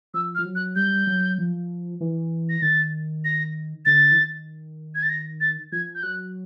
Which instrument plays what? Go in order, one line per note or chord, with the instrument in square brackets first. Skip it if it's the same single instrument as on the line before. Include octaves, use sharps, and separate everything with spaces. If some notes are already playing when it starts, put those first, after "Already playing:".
[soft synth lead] F3 [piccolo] E6
[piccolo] F6
[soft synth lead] F3
F#3
[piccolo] F#6
[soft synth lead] G3 [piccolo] G6
[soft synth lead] F#3
F3
E3
[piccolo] A#6
[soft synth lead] D#3 [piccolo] A6
[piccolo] A#6
[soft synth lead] D3 [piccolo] A6
[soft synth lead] E3
D#3
[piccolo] G#6
A6
A#6
A6
[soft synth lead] F3 [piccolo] G#6
[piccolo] G6
[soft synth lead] F#3 [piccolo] F#6